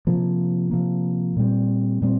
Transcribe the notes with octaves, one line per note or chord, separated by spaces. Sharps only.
C3 F3 A#3
C3 F3 A#3
A#2 G3 C4
A#2 G3 C4